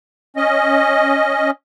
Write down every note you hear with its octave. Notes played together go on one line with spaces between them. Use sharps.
C#4 D#5